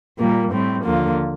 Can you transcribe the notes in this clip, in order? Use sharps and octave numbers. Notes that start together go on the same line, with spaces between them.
A#2 G3 A#3
A2 G3 C4
D#2 D3 F3 A#3 F4